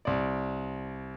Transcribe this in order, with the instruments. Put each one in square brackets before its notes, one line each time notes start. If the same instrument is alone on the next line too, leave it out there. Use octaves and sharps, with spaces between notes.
[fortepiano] C2 D5